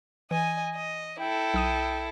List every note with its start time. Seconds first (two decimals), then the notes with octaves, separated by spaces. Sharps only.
0.31 E3 D#5 G#5
0.75 D#5
1.20 E4 A4 G5
1.54 B1 D#6 D#7